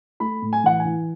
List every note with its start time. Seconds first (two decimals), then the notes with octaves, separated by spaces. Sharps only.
0.20 A3 B5
0.42 A2
0.53 G#5
0.64 E3 F#5
0.80 G#5
0.85 E3